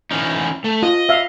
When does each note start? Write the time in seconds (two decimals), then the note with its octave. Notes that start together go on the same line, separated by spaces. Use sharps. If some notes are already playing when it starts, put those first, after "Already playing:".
0.11 E3 C#4 D#4
0.64 A3
0.83 F4 D#5
1.09 E5 F5